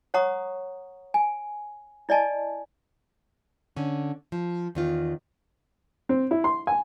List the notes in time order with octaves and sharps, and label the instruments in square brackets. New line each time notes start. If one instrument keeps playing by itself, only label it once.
[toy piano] C#5 F#5 A#5 C#6 D#6
G#5
E4 D5 D#5 G#5 A5
[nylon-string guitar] D3 C#4
F3
E2 D#3 F4
[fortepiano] C4
E4
C6
G#5